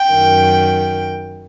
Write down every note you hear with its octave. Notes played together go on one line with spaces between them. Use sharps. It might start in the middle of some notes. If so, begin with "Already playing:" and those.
Already playing: G5
F#2 D#3